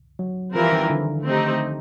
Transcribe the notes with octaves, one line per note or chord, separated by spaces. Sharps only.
F#3
E3 F3 G3 C4 F4 A#4
D#3
D3
A3 C4 D#4 G4